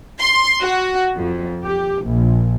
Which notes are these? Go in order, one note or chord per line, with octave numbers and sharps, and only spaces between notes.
C6
F#4
F2
G4
A#1